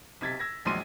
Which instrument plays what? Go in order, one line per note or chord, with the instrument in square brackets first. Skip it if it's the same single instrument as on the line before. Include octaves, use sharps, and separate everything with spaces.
[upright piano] B1 C3 G#6 A6 B6
E6 G#6 A#6
A#1 E2 F#3 G#3 C6 D#7